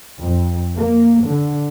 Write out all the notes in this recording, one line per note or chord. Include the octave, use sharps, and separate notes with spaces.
F2
A#3
D3